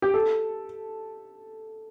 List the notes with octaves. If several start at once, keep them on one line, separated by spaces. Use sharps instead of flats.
G4
A4